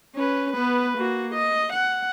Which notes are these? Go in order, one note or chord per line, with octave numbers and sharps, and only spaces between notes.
C#4 B4
B3 B4
A#3 F#4
D#5
F#5